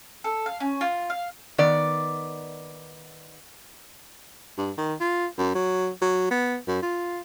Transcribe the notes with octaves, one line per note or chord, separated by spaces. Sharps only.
A4
F5
C#4
F4
F5
D#3 B3 D5
G2
D#3
F4
F#2
F#3
F#3
B3
F#2
F4